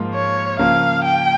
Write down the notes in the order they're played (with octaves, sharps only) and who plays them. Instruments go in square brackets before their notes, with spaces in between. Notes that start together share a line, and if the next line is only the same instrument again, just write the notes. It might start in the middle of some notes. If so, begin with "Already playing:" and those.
Already playing: [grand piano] G#2 F3 A#3 F4
[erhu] C#5
[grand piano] C#3 F3 A#3 [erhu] F5
[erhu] G5